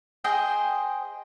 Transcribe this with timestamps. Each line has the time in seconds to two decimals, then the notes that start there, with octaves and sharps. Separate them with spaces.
0.24 G#4 C5 D#5 G5